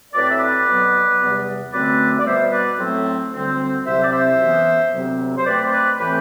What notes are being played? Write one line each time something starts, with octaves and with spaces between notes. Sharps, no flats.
A2 F#3 C4 B4 D5
E5
B4 D5
B2 F#3 B3
E2 C3 G3 B3
F#2 D3 A3 C4 B4 D5
D5
B2 G3 B3 C5 E5
B4 D5
A2 F#3 A3 C4
D2 D3 G3 C4
C2 C3 F#3 C4 C5 E5
D5
C5 E5
F#2 E3 B3
D2 C3 F#3 C4
C5
B2 A3 C4 B4 D5
C5
B4 D5
A2 E3 A3 C4 G4 B4